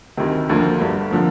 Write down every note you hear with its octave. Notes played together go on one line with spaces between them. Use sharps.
D2 C3 D#3
D2 D3 F3 A#3
G1 G2 D3
D3 F3 A#3